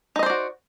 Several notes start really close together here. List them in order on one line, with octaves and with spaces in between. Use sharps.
D#4 D#5 C5 D5 F#4